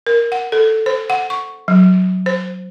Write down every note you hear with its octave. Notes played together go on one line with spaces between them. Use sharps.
A#4
F#5
A4
C5
F#5
C#6
F#3
C5